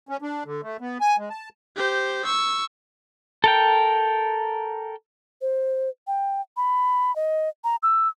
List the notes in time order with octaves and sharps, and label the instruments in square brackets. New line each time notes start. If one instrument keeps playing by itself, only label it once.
[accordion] C#4
D4
D3
A3
B3
G#5
G#3
A5
[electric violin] G4 C5
C#6 E6
[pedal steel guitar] A4 A#4 G5
[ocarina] C5
G5
B5
D#5
A#5
E6